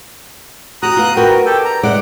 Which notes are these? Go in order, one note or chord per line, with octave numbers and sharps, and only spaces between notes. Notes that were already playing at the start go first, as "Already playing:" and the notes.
F#4 G4 A#5 D#6 F#6
B3 F4
D4 F#4 A#4 B4 G5
G4 A4 G5
A#5
G#3 E4 D5 F#5 D6